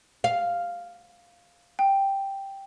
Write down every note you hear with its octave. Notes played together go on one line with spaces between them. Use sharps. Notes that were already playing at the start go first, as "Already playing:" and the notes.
F5
G5